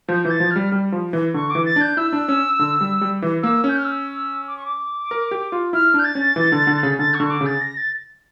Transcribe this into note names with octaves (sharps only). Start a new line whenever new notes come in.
F3 G6
E3 G6
A6
F3
F6
G3
G3
F3
E3
D3 C#6
E3 D6
A6
D4 G6
E4 E6
D4
C#4
D3
G3
G3
E3
A#3 E6
C#4 G6
F6
E6
D6
C#6
D6
A#4
G4
F4
E4 F6
D4
G6
A6
C#4
E3
D3
D3
C#3
D3 A6
C#6
D3
C#6
D6
C#3
A6
A#6
A6